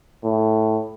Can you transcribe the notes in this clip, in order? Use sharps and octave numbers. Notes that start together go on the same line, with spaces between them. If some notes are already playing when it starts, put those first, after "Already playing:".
A2